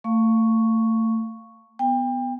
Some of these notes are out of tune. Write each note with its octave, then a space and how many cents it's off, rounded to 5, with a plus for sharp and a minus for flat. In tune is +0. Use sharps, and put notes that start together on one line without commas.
A3 +30 F5 +0 C#6 +0
B3 +10 G5 +30